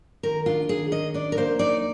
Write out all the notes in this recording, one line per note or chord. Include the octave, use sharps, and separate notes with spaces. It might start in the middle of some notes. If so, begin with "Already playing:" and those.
D#3 A#4
D4 F4
D#3 G#4
D#3 D#5
D4 D5
A#4
A#3 C5
D#4 D5